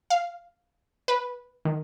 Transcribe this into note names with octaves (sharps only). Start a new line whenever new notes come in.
F5
B4
D#3